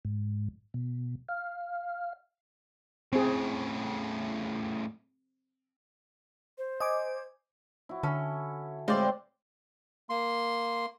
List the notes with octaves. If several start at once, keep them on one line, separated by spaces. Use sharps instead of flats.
G#2
B2
F5
A2 C#3 C4 G#4
C5
D#5 G#5 D6
E4 F#4
D3 C#4 A4 G#5
A2 G3 G#3 C4 C5 D5 F5
A#3 C6